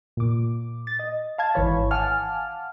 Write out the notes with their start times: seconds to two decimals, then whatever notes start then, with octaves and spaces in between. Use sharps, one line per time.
0.17 A#2 D6
0.87 A6
0.99 D#5
1.38 F5 A5 G#6
1.54 G#1 E3 C#5 B5
1.91 F5 F#5 G#5 A5 D6 F6